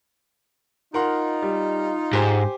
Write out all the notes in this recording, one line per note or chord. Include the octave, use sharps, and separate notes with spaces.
D#4 F4 A#4 F#5 C6
G3
G#2 G4 C5 G#5